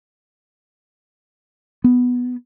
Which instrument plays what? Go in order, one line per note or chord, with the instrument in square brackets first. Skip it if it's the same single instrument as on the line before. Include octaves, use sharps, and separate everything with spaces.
[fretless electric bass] B3